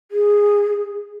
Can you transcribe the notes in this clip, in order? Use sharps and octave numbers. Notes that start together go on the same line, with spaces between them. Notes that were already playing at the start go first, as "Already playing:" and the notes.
G#4